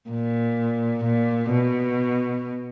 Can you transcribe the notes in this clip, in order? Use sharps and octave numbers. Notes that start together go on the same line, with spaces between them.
A#2
A#2
B2